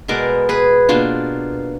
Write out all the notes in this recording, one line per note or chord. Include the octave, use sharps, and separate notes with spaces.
B2 G#3 B3 A#4 D5
G#4 B4
B2 A#3 D4 F4